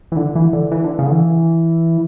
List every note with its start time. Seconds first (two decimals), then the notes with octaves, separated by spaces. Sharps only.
0.12 E3
0.16 D3
0.35 E3
0.53 D3
0.71 E3
0.84 D3
0.99 C#3
1.06 D3
1.12 E3